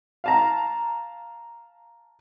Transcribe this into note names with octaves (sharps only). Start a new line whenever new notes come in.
F5 A5 A#5